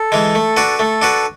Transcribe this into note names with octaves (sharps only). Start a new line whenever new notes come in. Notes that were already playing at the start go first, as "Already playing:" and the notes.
Already playing: A4
E3 G#3
A3
D4 F#4 B4
A3 A4
D4 F#4 B4